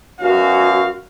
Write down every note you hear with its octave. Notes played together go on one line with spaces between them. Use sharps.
F#2 B2 C#4 F#4 F5